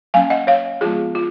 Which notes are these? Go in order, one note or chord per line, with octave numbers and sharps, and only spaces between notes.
F#3 A#3 C#4 F5 G#5
D#5 F#5
C#5 F5
F3 G#3 B3 F4 G#4
F4